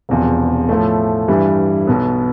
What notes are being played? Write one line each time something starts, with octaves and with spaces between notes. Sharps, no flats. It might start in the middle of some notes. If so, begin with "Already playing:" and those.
E1 E2 C3 F3
A2 F3 A3
G2 E3 G3
B1 B2 B3